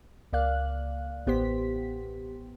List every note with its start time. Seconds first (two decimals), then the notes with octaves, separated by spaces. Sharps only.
0.33 C#2 A#3 D5 F5 F#6
1.26 A1 B3 G4 C5 B6